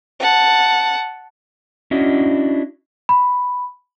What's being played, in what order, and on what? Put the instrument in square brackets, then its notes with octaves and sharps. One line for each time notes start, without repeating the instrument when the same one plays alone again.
[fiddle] F#5 A5
[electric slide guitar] C#4 D4 E4 F#4 D#5
[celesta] B5